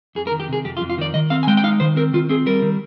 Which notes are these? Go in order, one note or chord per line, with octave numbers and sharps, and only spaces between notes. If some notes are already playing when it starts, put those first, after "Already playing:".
F2 G#4
A#4
D#3
G4
C3 G#4
F2 G4
F4
F2
F4
D#3 D5
D#3 D#5
C4 F5
G#5
G#3 G5
G5
D#4 F5
D#3 C5
C4 A#4
D#3 F4
C4 G#4
G3 A#4
D#3